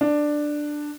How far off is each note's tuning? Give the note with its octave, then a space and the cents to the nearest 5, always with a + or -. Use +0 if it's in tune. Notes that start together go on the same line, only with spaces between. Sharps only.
D4 +10